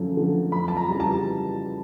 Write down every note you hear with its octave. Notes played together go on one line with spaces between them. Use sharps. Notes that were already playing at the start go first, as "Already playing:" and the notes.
Already playing: F#2 D3 F3 A3
D3 F3 A3
F2 B5
A5
A#5
C#3 E3 G3 A#5
A5